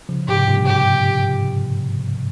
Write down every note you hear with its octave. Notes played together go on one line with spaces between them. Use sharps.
C#3 F3
G#2 C3 G4
G2 A#2
G4